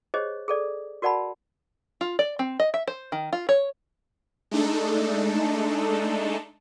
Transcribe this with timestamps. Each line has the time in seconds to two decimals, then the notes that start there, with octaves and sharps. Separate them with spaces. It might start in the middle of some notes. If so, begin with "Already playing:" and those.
0.14 G4 G#4 C5 C#5 D#5
0.48 G#4 A4 D5
1.02 F#4 A#4 D5 F#5 A5 B5
2.01 F4
2.19 D5
2.39 C4
2.60 D#5
2.74 E5
2.87 C5
3.12 D#3
3.33 F4
3.49 C#5
4.51 G#3 A3 D4 D#4 A4